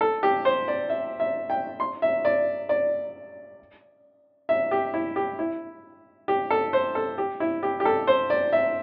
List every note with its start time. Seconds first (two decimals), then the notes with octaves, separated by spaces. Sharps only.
0.01 A4
0.23 G4
0.45 C5
0.68 D5
0.90 E5
1.20 E5
1.50 G5
1.80 C6
2.02 E5
2.25 D5
2.69 D5
4.49 E5
4.71 G4
4.94 E4
5.16 G4
5.39 E4
6.28 G4
6.50 A4
6.73 C5
6.95 A4
7.18 G4
7.40 E4
7.63 G4
7.80 G4
7.85 A4
8.07 C5
8.30 D5
8.53 E5